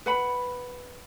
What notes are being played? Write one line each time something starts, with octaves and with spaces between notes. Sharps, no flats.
B4 F#5 B5